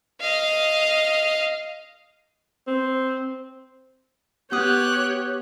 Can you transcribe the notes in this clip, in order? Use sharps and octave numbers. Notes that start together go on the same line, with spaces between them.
D#5 F5
C4
B3 G4 C#5 D#6 F#6